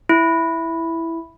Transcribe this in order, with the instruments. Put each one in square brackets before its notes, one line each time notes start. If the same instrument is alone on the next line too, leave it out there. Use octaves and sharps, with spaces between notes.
[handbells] E4